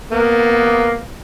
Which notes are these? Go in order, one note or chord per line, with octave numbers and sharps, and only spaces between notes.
A#3 B3